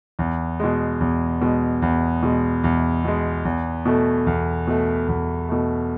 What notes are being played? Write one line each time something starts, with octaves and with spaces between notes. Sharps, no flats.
E2
B2 G#3
E2
B2 G#3
E2
B2 G#3
E2
B2 G#3
E2
B2 A3
E2
B2 A3
E2
B2 A3